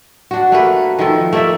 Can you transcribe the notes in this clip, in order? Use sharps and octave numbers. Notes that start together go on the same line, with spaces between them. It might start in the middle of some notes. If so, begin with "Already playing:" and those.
D4 F#4
A3 A#3 B4
D#3 F3 A4
A3 A#3 D5 E5